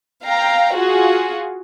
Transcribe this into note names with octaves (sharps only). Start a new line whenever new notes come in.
F5 G5 A#5
F4 F#4 G#4